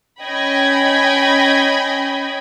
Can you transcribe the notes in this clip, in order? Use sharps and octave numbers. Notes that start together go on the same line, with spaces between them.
C#4 D#5 G5 B5 G#6